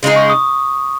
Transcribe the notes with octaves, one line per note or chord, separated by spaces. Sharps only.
C#3 G#3 D#4 G#4
C#6
D#6